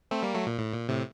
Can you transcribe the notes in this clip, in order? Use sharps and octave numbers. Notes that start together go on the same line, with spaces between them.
A3 C4
G3 A#3
F#3 A3
A#2
A2
A#2
A2 C3